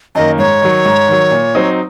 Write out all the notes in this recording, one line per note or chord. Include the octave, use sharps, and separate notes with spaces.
F#2 D#3 A#3 D#5
G#2 C#5
D#3 F#3
G#2
D#3 F#3
A#2
F#3 C4 D#4